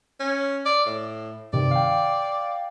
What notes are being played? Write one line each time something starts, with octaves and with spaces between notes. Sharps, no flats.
C#4
D5
A2
G2 C3 D#3 D5
F5 G5